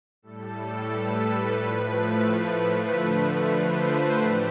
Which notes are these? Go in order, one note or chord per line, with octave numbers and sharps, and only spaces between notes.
A2 G3 A4
B4
A2 F3 A3
D3 F3 A3
C5
B4
A2 E3 A3 G4